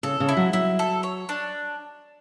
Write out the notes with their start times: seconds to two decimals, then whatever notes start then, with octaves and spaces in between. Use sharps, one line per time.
0.03 C#3 A4
0.20 C#3
0.29 E4
0.37 F#3
0.53 F#3 E4
0.79 A4
1.03 C#5
1.29 D4